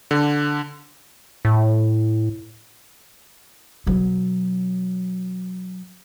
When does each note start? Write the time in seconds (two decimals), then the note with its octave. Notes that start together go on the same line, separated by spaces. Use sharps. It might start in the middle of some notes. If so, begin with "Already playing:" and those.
0.11 D3
1.45 A2
3.87 B2 F#3